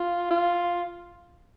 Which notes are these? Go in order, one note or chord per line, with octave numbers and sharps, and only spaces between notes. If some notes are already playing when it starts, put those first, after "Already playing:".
Already playing: F4
F4